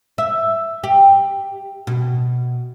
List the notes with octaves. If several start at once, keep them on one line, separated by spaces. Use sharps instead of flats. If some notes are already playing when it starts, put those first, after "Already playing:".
E5
G4
B2